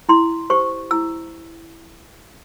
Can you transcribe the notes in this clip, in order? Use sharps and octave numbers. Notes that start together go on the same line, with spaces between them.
E4 C6
G4 C5 C#6
E4 E6